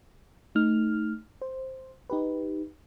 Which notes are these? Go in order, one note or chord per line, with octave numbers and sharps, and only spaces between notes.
A3 D#4 F6
C5
D#4 G4 B4